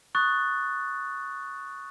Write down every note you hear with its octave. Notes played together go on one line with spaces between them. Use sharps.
C#6 D#6 F#6 A6